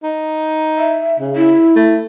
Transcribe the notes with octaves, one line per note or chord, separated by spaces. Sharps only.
D#4
E5
C#3
E4
A3